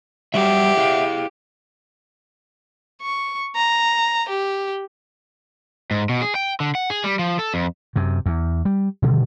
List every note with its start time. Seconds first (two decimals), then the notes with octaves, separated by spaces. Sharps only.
0.34 F#3 G3 F#4 G4 E5 F#5
0.77 E4 G#4 F5
3.02 C#6
3.56 A#5
4.28 G4
5.91 G#2
6.09 B2
6.22 G#4
6.35 G5
6.60 D3
6.75 F#5
6.90 G#4
7.04 G3
7.19 F3
7.39 A4
7.54 F2
7.96 F#2 C3
8.26 E2
8.65 G3
9.02 B2 D3 D#3 G3